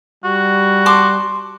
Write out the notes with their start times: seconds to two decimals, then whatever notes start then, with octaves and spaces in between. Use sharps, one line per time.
0.24 G3 F#4
0.86 A5 C6 D6